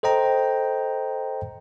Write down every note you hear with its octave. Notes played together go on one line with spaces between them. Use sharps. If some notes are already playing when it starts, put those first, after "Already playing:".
A4 C5 D#5 G5 A#5